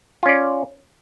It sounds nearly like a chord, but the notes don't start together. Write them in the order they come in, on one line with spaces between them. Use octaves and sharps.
F4 C#4 D5